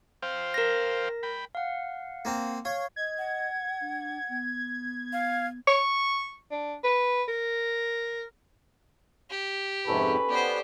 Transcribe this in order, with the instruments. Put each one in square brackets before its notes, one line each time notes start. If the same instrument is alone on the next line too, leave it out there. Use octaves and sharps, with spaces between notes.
[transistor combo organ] C5 F5 G5
[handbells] A#4 A#6
[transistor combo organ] G5 B5
[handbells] F5 F#5
[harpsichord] A#3 C4
[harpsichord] C#5 [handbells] F5
[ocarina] D#5 [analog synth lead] G#6
[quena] F#5
[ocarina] D4
B3
[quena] F5
[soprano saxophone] C#6
D4
B4
A#4
[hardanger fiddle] G4
[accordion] F2 G#2 C3 [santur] C#4 D#4 A4 [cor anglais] B4
[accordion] B3 [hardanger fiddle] G4 C5 [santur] D5